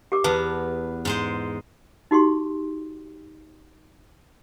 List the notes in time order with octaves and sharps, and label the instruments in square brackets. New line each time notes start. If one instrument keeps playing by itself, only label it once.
[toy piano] G4 A#4 D6
[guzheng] E2 B3 [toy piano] B4 A5 A#5
[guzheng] G#2 G#3 C5
[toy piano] D#4 F#4 G4 C6